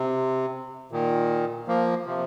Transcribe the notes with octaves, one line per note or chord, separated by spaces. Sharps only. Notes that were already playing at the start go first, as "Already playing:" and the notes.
Already playing: C3
A#2 D#3
F3 A#3
C3 F3